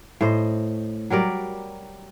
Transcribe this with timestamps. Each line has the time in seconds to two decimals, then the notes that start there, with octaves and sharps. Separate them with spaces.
0.21 A2 C5 D#5
1.10 F#3 G3 A#4 D5